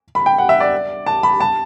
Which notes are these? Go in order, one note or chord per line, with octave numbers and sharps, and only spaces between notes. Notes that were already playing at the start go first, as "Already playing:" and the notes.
B5
G5
F#5
E5
D5
A5
B5
A5